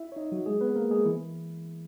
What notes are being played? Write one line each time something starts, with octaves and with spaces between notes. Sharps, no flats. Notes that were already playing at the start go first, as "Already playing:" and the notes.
Already playing: E4 E5
C#5
D#4 D#5
F#3 F#4
G#3 G#4
B3 B4
A#3 A#4
G#3 G#4
E3 E4